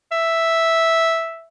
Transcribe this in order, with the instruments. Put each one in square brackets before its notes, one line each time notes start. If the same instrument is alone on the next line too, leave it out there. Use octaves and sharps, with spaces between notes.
[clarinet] E5